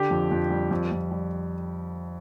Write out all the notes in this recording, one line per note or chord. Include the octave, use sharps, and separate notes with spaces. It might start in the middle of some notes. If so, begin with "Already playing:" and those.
Already playing: D3 G4
F2
F2
G3
F2
F2
G3